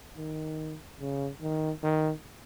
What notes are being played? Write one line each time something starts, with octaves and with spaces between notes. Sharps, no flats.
D#3
C#3
D#3
D#3